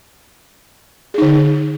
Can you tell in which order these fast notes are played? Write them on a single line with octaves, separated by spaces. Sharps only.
G#4 D#4 D3